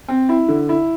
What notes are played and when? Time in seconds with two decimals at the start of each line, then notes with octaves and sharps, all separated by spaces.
0.08 C4
0.29 E4
0.48 D3
0.69 E4